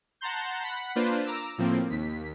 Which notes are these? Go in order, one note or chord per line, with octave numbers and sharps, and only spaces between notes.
F#5 A5 A#5 C6 G6
F#5 B5
A#3 D4 F4 B4 C5
A#5 D6 E6
A2 F3 A#3 C4
D#2 B6